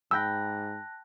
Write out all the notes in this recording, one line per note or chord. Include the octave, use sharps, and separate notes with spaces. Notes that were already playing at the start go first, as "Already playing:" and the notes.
G#2 G5 A5 B5 E6 F#6 A#6